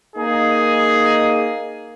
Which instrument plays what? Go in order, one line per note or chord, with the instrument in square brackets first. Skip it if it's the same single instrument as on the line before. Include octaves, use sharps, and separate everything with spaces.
[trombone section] A#3 D#4 [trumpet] G#4